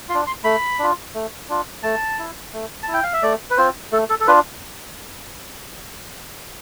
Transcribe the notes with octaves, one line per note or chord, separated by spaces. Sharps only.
F4 C6
D4
C6
A3 B5
D4 F4
A3
D4 F4
A3 A5
E4
A3
A5
E4
G5
F5
E5
A3 D5
B4
C4 F4 C5
A3 A4
A4
A4
D4 F4 B4